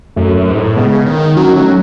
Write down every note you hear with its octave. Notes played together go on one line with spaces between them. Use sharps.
F#2 F#3 A3
F#2
G#2
A2
C#3 G#3 B3
D#3
F#3 C#4
D#4
F#3 A3 C#4